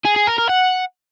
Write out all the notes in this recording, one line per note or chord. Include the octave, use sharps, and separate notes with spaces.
G#4
G#4
A#4
A#4
F#5